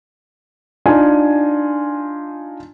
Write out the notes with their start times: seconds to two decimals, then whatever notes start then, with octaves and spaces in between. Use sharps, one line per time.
0.86 D4 D#4 F4 G#5